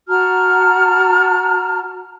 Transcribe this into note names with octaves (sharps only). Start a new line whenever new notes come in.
F#4 A5 A#5 F6